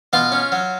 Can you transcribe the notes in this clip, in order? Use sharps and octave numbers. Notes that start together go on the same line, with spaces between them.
B2 F4 F5
C#4
F#3